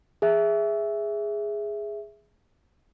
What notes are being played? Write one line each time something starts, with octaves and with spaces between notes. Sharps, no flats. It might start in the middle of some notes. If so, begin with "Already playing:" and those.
G#4 E5